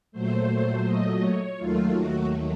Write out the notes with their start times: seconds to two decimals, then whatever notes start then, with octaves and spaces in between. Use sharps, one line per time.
0.12 A#2 F#3 A3 C5
0.85 D#5
1.21 C#5
1.57 D#2 D#3 F#3 A3 F4
1.94 F#4